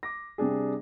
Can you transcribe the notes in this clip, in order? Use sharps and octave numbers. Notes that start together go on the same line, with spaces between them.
D6 A#6
C3 G3 D4 G#4